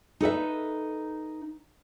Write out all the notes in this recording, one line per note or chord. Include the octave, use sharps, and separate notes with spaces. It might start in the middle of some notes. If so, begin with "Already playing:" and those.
D#4 A4 B4 E5